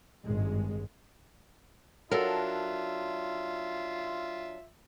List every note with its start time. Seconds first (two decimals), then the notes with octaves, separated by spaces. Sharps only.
0.24 G#1 G2 G#3
2.11 F#3 D4 F4 A4 A#4 E5